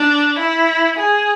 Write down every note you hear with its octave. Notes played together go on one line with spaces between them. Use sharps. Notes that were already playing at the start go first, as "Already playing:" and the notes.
Already playing: D4
E4
G#4